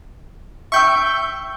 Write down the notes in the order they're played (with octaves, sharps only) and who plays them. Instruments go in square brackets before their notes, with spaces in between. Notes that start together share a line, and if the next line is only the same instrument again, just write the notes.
[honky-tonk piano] E5 G5 E6 [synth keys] C#6 G6